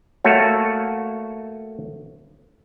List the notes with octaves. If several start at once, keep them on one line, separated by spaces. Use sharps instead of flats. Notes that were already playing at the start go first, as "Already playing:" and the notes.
A3 A#3 F#4 C#5